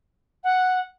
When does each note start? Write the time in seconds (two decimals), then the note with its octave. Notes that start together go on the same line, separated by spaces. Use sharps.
0.44 F#5